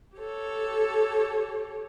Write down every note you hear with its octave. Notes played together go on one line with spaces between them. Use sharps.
G4 A4 C#5